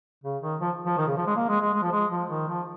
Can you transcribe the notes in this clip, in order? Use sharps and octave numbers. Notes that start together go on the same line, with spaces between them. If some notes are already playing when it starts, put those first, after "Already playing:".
C#3
D#3
F3
F3
D#3
C#3
F3
G#3
A#3
G#3
G#3
G#3
F3
G#3
F3
D#3
F3